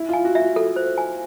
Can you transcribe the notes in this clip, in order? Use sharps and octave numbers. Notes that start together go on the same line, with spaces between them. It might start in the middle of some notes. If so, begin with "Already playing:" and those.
Already playing: E4
F4 G#5
F#4
F#4 E5
A4
C5
G#5